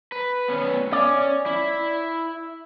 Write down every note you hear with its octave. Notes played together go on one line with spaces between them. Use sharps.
B4
B3 C#4
C#4 D5
E4